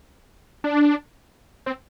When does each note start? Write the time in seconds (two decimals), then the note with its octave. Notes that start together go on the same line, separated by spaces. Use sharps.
0.64 D4
1.66 C4